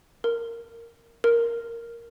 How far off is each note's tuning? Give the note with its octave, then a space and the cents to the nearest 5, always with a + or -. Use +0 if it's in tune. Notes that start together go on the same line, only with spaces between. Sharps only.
A#4 -5
A#4 +0